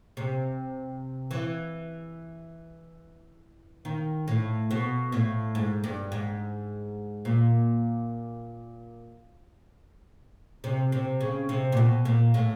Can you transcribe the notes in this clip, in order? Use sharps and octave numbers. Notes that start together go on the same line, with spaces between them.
C3
E3
D#3
A2
B2
A2
G#2
G2
G#2
A#2
C3
C3
C#3
C3
A#2
B2
A#2
A2